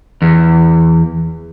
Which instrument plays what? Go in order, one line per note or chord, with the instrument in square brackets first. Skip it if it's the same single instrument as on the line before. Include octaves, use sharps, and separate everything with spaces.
[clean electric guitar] E2